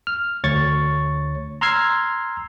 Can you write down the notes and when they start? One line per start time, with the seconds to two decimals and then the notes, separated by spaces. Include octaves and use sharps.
0.07 F6
0.44 D2 C#5 C#6 A6
1.61 A#5 C6 E6 F6 G#6 C7